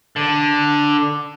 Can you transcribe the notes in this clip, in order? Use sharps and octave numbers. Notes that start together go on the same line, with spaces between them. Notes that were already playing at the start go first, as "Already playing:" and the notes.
D3